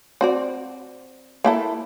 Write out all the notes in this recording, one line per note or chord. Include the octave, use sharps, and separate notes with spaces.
C4 F#4 D5
A#3 E4 A4